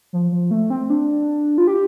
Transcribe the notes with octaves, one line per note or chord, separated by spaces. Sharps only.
F3
F3
A3
C4
D4
F4
G4